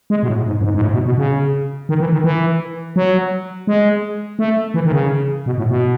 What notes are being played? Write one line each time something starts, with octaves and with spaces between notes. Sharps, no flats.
G#3
B2
A2
G#2
F#2
G#2
G#2
A2
B2
B2
C#3
D#3
E3
D#3
E3
F#3
G#3
A3
E3
D#3
C#3
B2
A2
B2